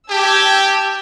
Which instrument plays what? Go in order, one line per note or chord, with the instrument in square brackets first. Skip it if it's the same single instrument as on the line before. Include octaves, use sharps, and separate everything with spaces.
[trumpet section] G4 [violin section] A5 E6 G#6